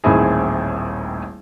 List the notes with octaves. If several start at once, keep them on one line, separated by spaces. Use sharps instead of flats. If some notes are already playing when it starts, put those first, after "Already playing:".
D#1 A1 D#3 C4 E4 G#4